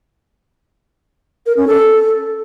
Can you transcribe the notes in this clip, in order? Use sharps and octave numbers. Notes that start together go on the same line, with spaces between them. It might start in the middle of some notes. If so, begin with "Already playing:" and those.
A#4
C#4
A4